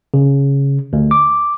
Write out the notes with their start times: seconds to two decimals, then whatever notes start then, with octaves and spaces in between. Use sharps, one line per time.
0.14 C#3
0.93 D2
1.11 D6